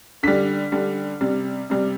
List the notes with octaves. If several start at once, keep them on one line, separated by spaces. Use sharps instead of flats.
D3 G3 B6
D3 G3
C3 G3
C3 G3